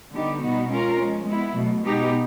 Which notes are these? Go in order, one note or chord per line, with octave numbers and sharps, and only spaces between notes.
D3 G3 B3 D#4 G4
B2 G3 B3 D#4 F#4
G#3 C#4 F4 A#4
F3 G#3 C#4
G#3 B3 E4
B2 F#3 A3
B2 G#3 B3 D#4 G4